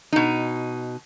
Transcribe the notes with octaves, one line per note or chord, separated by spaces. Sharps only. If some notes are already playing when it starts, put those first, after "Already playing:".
B2 D#4